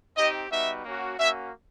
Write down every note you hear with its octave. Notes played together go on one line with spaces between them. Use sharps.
C4 D#4 G4 D#5
G3 B3 D#4 F#4 E5
A#3 C#4 F#4
A#3 C#4 F#4 E5